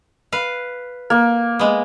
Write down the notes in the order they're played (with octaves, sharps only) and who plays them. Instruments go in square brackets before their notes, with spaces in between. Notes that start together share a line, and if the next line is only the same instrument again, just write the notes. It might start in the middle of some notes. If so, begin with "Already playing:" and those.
[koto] B4 F5
[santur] A#3
[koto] G#3 B3